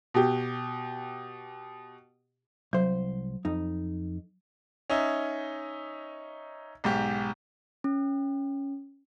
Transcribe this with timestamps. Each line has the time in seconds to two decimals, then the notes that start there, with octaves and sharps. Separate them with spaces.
0.14 B2 G4
2.73 C2 F#3 C5
3.45 F2 D#4
4.90 C#4 D#4 E5
6.84 B1 G#2 G4
7.84 C#4